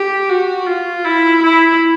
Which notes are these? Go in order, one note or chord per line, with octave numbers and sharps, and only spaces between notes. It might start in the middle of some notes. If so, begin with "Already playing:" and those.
Already playing: G4
F#4
F4
E4
E4